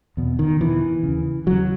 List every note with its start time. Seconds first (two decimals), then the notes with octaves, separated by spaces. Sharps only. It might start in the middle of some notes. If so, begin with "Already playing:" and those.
0.17 E2 B2
0.39 D#3
0.60 E2 B2 E3
1.03 D#2 C#3
1.46 D#2 C#3 F#3